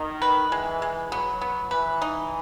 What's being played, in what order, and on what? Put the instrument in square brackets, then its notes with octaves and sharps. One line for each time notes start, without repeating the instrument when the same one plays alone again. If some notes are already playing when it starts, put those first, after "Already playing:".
Already playing: [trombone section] D#3 [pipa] D#4
[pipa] B4
[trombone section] E3 [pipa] G#3
[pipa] G#3
[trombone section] F#3 [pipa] B3
[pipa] B3
[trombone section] E3 [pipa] B4
[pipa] D#4